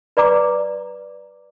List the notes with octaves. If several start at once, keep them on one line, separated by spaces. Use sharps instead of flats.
B4 D5 A#5 D6